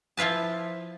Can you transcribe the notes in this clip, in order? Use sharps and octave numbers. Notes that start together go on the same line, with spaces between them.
F3 E4 F4 B4 A5